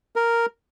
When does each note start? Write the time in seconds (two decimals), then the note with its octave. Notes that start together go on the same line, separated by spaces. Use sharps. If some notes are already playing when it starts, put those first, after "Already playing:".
0.16 A#4